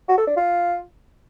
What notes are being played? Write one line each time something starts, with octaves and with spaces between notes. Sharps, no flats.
F#4
A4
D4
F4